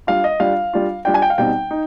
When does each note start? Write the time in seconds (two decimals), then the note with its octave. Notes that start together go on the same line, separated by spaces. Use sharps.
0.07 G3 D4 F4 F5
0.24 D#5
0.40 G3 D4 F4 F5
0.73 G3 D4 F4
1.05 G3 D4 F4 G5
1.14 G#5
1.22 G5
1.30 F5
1.38 B2 G3 C4 D#4 G5
1.71 D#4